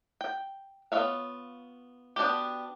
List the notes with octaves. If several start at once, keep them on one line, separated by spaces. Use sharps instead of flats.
G5
B3 F4 C#5 E5 F5
B3 D4 F#4 G4